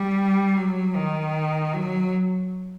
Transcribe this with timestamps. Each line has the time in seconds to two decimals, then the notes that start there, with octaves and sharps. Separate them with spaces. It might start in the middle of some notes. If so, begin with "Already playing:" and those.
Already playing: G3
0.57 F#3
0.96 D#3
1.74 F#3